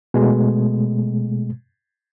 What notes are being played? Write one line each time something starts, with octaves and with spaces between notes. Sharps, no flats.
B2 G#3 A3